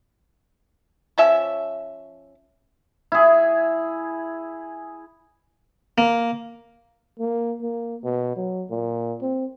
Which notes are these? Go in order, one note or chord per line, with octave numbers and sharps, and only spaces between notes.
F3 C#4 E5
E4 G#4
A#3
A#3
A#3
B2
F#3
A#2
C4